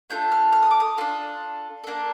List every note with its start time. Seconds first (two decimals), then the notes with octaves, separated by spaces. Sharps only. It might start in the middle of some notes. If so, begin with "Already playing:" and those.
0.10 A3 D4 F4 A4 G6
0.32 F6
0.52 F6
0.63 D#6
0.71 D6
0.80 D#6
0.97 D4 F4 A4
1.84 A#3 D4 A4